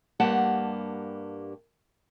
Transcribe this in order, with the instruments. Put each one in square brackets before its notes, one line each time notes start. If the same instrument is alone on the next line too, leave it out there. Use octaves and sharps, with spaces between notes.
[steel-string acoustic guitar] G2 A#3 G4 F#5 A5